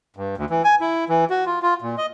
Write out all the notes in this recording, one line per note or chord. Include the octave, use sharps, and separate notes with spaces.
G2
D2
E3
G#5
E4
E3
F#4
F4
F4
A#2
D#5